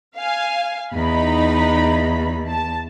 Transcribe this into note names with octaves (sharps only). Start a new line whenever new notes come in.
F5 G#5
E2 D#4 D#5 B5
A5